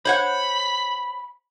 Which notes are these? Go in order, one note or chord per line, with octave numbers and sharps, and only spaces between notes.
C5 C#5 F#5 B5